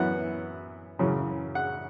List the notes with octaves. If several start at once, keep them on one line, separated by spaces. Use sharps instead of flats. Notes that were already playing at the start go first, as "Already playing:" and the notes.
Already playing: F#2 E3 B3 E4 F#5
F#2 C#3 E3
F#5